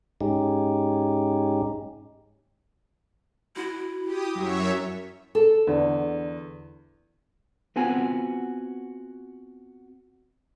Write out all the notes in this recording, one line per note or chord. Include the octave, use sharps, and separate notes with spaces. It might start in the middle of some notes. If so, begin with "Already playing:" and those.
G#2 G#3 C#4 D#4 G4
E4 F#4
G4 D#6
F#2 F#3 C#5 E5
A4
E2 D3
B3 C4 F4 F#4 F#5 G#5